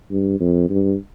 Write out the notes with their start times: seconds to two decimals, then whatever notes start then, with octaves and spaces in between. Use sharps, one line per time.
0.11 G2
0.40 F2
0.69 G2